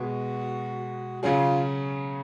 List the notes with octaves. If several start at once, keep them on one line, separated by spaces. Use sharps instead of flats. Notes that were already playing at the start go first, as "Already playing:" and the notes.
Already playing: B2 G#3 B3 F#4
C#3 F#3 C#4 F4 G#4